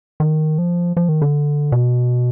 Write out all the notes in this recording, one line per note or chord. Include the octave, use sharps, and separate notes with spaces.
D#3
F3
F3
D#3
D3
B2